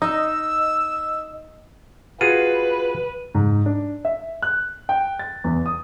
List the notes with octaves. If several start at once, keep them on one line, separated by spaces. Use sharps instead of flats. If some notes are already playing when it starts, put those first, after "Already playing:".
D#4 D#5 E6
F4 F#4 G#4 B4 D#7
G#2
D4
E5
F#6
G5
A6
E2
D#6